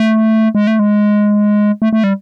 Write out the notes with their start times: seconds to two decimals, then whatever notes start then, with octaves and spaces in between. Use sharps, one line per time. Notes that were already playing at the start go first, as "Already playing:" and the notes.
Already playing: A3
0.55 G#3
0.67 A3
0.79 G#3
1.82 A3
1.93 A3
2.04 G3